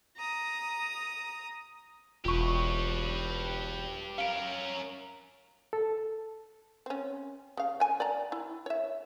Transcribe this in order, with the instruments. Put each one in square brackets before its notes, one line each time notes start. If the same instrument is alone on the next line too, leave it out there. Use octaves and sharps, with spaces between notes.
[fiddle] A#5 D#6
[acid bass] E1 [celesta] F4 C#6 [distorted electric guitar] G4 B4
[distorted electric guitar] C#4 A#4 [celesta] F5 D7
[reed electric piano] A4
[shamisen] C4 C#4
C#3 F5
G5 G#5
D5 G5 A#5
E4
C#5 E5